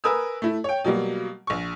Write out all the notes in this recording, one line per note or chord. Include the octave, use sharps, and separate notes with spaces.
A#4 B4 G#5 D#6 E6
A3 E4
C#5 G5
B2 F#3 G3 A#3
A#1 C#6